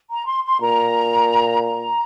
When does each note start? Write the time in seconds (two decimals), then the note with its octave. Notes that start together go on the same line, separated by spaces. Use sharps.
0.10 A#5
0.27 C6
0.44 C6
0.61 A#2 A#5
1.62 A#5